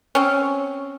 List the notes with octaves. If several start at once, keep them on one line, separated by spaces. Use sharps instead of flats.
C4 C#4